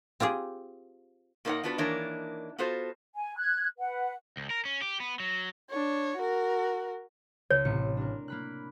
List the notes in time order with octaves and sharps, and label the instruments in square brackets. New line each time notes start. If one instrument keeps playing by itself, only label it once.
[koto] C4 F4 G4 G#4
[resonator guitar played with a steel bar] A#2 A#3 D#4 B4 C#5 F#5
B3 D4 F4 F#4 B4
D#3 E3 A#3 D4 A#4 C#5
B3 F4 F#4 A4 C5
[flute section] G#5
F#6 G#6
B4 F#5
[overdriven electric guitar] C#2
A#4
C#4
G4
B3
F#3
[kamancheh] D4 C#5
F#4 A#4
[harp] C#2 [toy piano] C#5
[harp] A1 C3 C#7
D4 A#4
A#3 B5 F#6